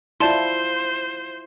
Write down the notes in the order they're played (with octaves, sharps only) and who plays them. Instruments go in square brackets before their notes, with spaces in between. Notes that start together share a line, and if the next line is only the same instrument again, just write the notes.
[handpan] E4 F4 [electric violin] C5 [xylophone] D5 A5 C6